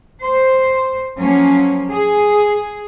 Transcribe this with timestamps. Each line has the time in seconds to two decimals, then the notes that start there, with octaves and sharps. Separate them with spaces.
0.23 C5
1.17 F3 F#3 A#3 C#4
1.88 G#4